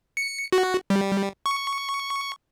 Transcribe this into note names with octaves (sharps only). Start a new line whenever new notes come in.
C#7
F#4
G3
C#6